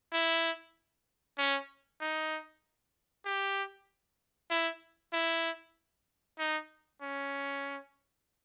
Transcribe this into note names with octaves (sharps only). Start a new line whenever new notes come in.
E4
C#4
D#4
G4
E4
E4
D#4
C#4